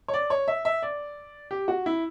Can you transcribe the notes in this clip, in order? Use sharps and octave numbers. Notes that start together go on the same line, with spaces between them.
C#5
D5
C#5
E5
E5
D5
G4
F#4
E4